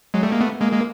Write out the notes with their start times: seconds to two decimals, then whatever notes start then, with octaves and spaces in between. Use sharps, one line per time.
0.14 F#3 G#3
0.23 G3 A3
0.32 G#3 A#3
0.41 A3 B3
0.61 G#3 A#3
0.72 G#3 A#3